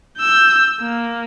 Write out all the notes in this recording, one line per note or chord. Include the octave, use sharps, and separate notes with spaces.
E6 G6
A#3